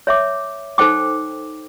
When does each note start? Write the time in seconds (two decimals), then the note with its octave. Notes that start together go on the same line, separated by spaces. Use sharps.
0.07 C#5 E5 D6
0.78 D#4 A4 C5 G5 D6